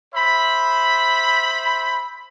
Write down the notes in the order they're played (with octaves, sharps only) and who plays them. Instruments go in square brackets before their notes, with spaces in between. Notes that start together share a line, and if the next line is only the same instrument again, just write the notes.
[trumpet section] C5 E5 B5